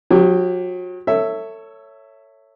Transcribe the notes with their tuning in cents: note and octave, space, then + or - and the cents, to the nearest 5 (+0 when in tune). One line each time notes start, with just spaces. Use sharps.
F#3 -40 G4 -10
A4 +30 C#5 +0 E5 +0